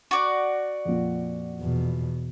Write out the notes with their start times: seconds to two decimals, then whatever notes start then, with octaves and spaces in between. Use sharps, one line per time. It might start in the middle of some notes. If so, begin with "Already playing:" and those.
0.11 F#4 D5
0.85 F2 A#2
1.60 E2 B2